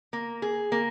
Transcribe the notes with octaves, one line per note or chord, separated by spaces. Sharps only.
A#3
G#4
A#3